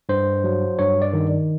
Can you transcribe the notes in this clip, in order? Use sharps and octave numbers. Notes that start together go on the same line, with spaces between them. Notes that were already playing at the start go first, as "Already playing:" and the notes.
G2 C5
F#3
G2 C#5
D5
D#3